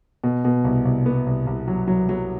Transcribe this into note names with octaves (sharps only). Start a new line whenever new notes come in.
B2
B2
C2
C2
B3
C2
C2
F#3
F#3
F#3